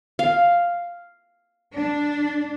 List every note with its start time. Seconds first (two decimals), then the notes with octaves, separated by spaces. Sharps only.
0.19 F5
1.74 D4